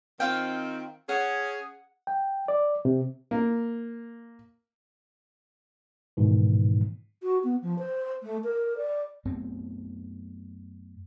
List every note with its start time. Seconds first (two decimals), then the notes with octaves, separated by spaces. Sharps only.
0.20 D#3 C4 F4 F5 G5
1.09 C#4 G#4 F#5
2.07 G5
2.48 D5
2.85 C3
3.31 A#3
6.17 G#2 B2 D#3 E3
7.22 F#4
7.43 B3
7.61 F3
7.78 C5
8.22 A3
8.43 A#4
8.77 D5
9.25 F#2 A3 B3 C4